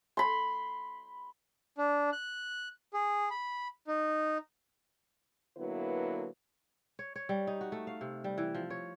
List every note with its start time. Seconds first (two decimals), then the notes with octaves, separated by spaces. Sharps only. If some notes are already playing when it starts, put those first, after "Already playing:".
0.17 B5 C6
1.77 D4
2.13 F#6
2.94 G#4
3.30 B5
3.87 D#4
5.57 D3 F#3 A#3 B3 E4 B4
6.99 C#5
7.16 C#5
7.29 G3
7.47 D#4
7.61 F#4
7.72 A3
7.87 F5
8.01 C3
8.24 G3
8.38 E3
8.55 F3
8.70 C#5